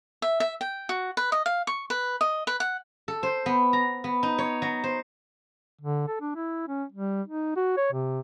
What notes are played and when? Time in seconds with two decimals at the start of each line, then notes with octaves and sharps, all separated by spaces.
0.22 E5
0.40 E5
0.61 G5
0.89 F#4
1.17 B4
1.32 D#5
1.46 F5
1.67 C#6
1.90 B4
2.21 D#5
2.47 B4
2.60 F#5
3.08 A4
3.23 C5
3.46 B3
3.73 A#5
4.04 B3
4.23 D#4
4.38 C#5
4.62 F#3
4.84 C5
5.81 D3
6.07 A4
6.21 D4
6.35 E4
6.68 C#4
6.92 G3
7.28 D#4
7.56 F#4
7.77 C#5
7.92 C3